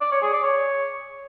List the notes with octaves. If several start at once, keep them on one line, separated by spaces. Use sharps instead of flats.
D5
C#5
G#4
D5
C#5